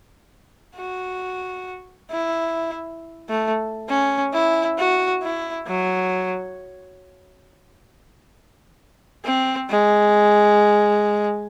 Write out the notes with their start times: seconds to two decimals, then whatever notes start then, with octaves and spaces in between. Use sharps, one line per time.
0.76 F#4
2.10 E4
3.29 A3
3.89 C#4
4.33 E4
4.78 F#4
5.22 E4
5.67 F#3
9.25 C4
9.69 G#3